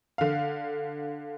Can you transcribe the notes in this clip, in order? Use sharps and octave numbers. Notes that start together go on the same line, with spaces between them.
D3 F5